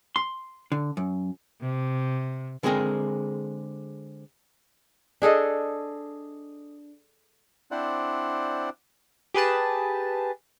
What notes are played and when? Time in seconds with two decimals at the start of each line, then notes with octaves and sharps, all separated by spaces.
0.16 C6
0.72 D3
0.97 F#2
1.61 C3
2.63 D3 G#3 C4 G#4 A#4
5.22 D4 G#4 A4 D#5
7.71 C4 D4 E4 C5 D5 F#5
9.34 G4 G#4 B4 A5